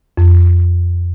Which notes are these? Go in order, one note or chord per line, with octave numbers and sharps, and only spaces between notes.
F2